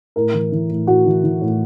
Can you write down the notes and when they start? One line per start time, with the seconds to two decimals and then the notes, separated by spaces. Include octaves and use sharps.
0.16 A2 A#4
0.34 E3
0.52 E3
0.70 A2
0.87 A2 F#4
1.06 E3
1.24 E3
1.42 A2